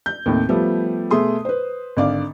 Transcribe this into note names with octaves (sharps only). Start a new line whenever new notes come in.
G6
D#2 A2 C3
F3 G3 A3 B3
B2 A3 G#4 C6 D#6
B4 C5
G#1 D3 D5 F5 D6